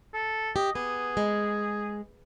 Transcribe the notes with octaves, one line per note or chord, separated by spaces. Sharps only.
A4
G4 D#5
B3 G#4
G#3